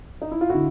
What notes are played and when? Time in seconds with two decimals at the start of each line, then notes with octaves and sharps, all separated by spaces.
0.22 D#4
0.32 E4
0.41 F4
0.49 D3 E4 F#4